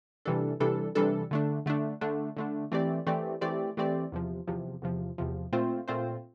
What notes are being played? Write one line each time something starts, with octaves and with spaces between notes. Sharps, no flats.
C3 E3 G3 D4 A4
C3 E3 G3 D4 A4
C3 E3 G3 D4 A4
D3 A3 D4
D3 A3 D4
D3 A3 D4
D3 A3 D4
E3 A3 C4 G4 D5
E3 A3 C4 G4 D5
E3 A3 C4 G4 D5
E3 A3 C4 G4 D5
E2 C3 F3
E2 C3 F3
E2 C3 F3
E2 C3 F3
A#2 A3 C4 F4 C5
A#2 A3 C4 F4 C5